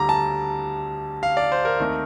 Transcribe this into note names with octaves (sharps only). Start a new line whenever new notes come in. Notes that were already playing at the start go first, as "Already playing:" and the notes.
Already playing: D2 D3 G3 A#5 D6
A5
F5
D5
C5
A#4
D#2 D#3 A3 C4